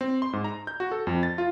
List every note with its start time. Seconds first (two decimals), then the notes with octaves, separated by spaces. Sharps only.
0.01 C4
0.22 C6
0.33 G#2
0.44 A#5
0.67 G6
0.80 F#4
0.92 A4
1.07 F2
1.23 A6
1.38 F4